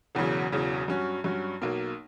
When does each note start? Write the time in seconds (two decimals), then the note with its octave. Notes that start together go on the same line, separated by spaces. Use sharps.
0.15 E1 E2 C#3 F#3
0.52 E1 E2 C#3 F#3
0.88 G2 F#3 C#4 F#4
1.24 G2 F#3 C#4 F#4
1.61 B1 B2 A#3